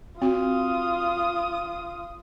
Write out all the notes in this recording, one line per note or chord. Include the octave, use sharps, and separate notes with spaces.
C4 F4 F#4 D#6